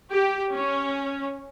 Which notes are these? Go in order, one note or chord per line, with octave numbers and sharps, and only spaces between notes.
G4
C#4